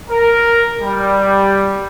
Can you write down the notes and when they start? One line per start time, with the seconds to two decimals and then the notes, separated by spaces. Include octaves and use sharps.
0.10 A#4
0.82 G3